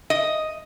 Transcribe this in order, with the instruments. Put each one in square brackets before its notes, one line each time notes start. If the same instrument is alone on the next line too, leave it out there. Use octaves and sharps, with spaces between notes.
[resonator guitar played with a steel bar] D#5